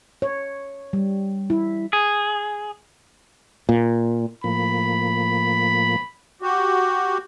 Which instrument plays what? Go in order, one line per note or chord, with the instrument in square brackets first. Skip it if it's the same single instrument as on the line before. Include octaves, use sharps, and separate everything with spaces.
[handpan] C#5
G3
E4
[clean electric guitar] G#4
[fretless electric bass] A#2
[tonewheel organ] A2 F3 A#3 [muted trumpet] B5
[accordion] F#4 G4